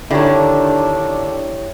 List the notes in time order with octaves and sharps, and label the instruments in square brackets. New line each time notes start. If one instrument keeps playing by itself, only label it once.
[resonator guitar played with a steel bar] D3 D#3 [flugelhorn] D4 [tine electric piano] E4 G4 C#5